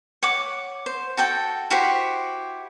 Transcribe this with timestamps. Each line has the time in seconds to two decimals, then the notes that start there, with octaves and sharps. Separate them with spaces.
0.23 C#5 F#5 D6
0.86 C5
1.17 F#4 A4 G5 A5
1.70 E4 F#4 G4 C5